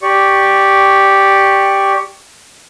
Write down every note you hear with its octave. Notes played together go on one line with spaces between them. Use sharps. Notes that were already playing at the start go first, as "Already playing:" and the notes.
G4 D5 C#6